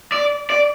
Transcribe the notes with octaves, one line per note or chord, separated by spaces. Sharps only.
D5
D5